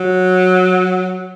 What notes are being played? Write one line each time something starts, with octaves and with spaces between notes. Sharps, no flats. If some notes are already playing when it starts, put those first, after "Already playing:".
Already playing: F#3